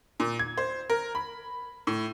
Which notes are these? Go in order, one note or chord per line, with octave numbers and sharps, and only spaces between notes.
A#2
G#6
C5
A#4
B5
A2